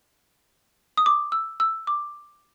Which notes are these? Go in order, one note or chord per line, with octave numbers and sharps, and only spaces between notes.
D#6
D6
E6
E6
D6